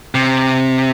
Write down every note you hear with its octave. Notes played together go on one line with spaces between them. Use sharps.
C3